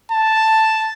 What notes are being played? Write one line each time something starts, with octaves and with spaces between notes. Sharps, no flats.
A5